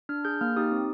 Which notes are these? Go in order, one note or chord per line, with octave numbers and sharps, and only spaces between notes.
D4 F6
G#4 G6
A#3 F6
D#4 G4 D#6
C4